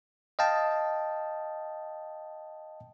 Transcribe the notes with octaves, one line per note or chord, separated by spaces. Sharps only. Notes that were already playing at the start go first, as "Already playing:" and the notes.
D#5 F5 G5 A5